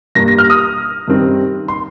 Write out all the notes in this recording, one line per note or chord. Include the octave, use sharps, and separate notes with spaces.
G2 G3 A#3 A#6
A#6
F6
D#6
G2 D#3 G3 C4
C6